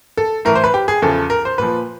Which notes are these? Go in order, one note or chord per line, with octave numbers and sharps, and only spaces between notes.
A4
A2 E3 A#4
C5
B4
G4
G#4
E2 C#3 F3 A4
A#4
C5
A#2 F3 B4